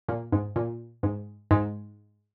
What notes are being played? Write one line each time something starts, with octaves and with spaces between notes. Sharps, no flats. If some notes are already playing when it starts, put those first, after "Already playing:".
A#2
G#2
A#2
G#2
G#2